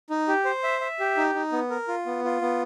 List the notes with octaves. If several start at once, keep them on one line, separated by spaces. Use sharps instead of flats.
D#4
G4
C5
E5
E5
G4
D#4
D#4
B3
A#4
F4
B3
F4
B3